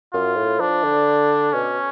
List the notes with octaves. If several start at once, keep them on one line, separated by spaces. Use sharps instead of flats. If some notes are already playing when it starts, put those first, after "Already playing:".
F#2 F4
A2
F3 D4
D3
B2 C#4